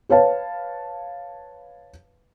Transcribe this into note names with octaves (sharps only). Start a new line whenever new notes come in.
B4 C#5 F5 A5